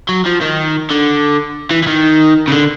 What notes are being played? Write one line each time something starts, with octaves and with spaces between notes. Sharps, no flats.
F#3
F3
D#3
D3
E3
E3
D#3
C#3
D3